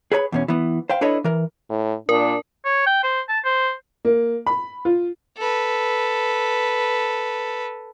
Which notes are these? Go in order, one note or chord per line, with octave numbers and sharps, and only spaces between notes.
G#4 B4 C#5 A#5 B5
E2 B2 C#4
E3 B3
C5 F5 G5
D4 E4 A4 B4 C#5 D#5
E3 A#4
A2
A#2 D4 A#4
C#5
G5
C5
A5
C5
A#3
B5
F4
A4 B4